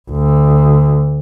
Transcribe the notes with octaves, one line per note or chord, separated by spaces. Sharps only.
D2